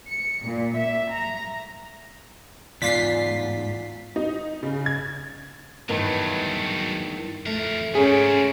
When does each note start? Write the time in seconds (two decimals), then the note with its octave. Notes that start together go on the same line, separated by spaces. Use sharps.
0.11 C#7
0.45 A#2
0.77 E5
1.13 A#5
2.82 E2 G#2 F4 D5 B6 C7
4.16 D#4
4.63 C#3
4.86 G#6
5.89 E2 G2 D#3 F#3 A3
7.46 F2 A3 A#4
7.95 G#2 A3 C4 C#4 G#4